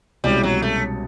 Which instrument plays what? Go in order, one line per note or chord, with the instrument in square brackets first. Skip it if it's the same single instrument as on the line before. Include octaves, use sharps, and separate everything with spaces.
[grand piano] C2 B2 G#3 C#4 E4 [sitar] G3
[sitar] F#3
A3